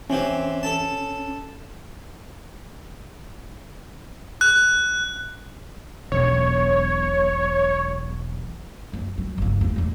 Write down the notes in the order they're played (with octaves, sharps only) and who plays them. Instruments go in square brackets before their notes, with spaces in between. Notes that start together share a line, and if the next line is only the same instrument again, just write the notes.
[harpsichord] E3 C4 G4 [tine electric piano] C#4
[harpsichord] A4 A5
[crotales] F#6
[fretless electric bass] E1 B1 [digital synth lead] C#5
[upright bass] F#2
F#3
G1 C#3
D#2
E2 A2